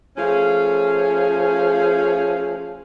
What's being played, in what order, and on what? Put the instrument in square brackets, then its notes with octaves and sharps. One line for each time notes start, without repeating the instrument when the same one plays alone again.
[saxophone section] F3 A3 C#4 G#4 F5